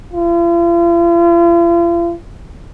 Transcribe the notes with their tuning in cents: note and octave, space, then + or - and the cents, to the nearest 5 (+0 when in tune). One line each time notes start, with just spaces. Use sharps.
F4 -45